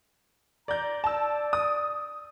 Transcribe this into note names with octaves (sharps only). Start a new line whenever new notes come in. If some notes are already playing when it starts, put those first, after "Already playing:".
D5 A#5 G6
D5 A5 E6
D#6